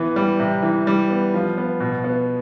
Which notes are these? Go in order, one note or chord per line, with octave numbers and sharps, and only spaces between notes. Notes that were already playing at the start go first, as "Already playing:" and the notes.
Already playing: E3 B3
G3
C3
E3
G3
B3
F3
B3
B2
B3